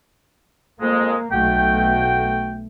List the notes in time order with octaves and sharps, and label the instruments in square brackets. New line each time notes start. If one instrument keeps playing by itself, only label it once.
[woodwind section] F2 G#3 [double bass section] A#3
[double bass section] B1 A3 [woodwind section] F#4 G5